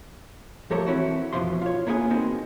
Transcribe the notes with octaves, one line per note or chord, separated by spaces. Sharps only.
F3 A3 G4 A4 A#4 C#5
E3 C4 C#4 E4 F#4
B1 F#2 B2 E3 F3 C6
F4 C#5
A#3 B3 E4 F4 G#4 G#5
B2 D#3 G#3 C4